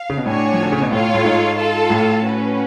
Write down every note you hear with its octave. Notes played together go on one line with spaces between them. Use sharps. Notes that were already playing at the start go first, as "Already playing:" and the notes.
Already playing: F5
C#3
B2
A2 D4 F#4 C#5 G#5
F3
D3
C#3
B2
A2 F4 A4 C#5 F5
A2
G#2
F4 A4 F5 A5
A2
C#4 F#4 B4